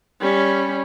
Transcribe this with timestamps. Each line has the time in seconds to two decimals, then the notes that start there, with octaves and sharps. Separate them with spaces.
0.21 G3 C#4